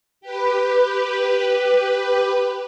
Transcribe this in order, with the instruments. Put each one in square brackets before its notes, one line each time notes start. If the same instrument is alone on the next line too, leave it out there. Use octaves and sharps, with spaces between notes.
[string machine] G4 B4